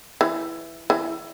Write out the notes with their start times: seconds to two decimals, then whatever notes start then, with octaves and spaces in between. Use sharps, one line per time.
0.21 E3
0.90 E3